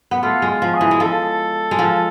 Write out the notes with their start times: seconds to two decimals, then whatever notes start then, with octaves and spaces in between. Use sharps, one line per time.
0.11 B3
0.23 A3 F4
0.42 G#3
0.49 F4
0.62 F3
0.74 G#4
0.81 E3
0.91 G#3
1.00 F3 A4
1.71 G#3
1.79 F3